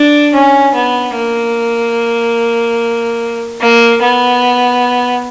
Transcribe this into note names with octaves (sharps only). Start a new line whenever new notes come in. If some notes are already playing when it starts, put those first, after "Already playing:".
Already playing: D4
C#4
B3
A#3
A#3
B3